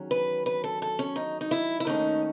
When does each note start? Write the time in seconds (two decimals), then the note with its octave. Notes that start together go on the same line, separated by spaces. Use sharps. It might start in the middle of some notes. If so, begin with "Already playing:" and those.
Already playing: E2 D#3 F#3 C#4
0.11 B4
0.46 B4
0.64 A4
0.82 A4
0.99 C#4
1.16 D#4
1.41 D#4
1.51 E4
1.80 E4
1.87 D#2 D#3 A3 C#4 D#4